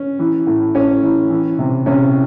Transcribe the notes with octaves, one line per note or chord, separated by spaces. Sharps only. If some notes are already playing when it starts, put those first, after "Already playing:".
Already playing: C#4
E3
A2
A2 C#4
E3
E3
C3
C3 C#4